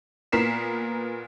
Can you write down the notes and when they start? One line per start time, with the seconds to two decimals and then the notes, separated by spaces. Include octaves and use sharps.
0.32 A#2 B3 A#4 B6 C7 E7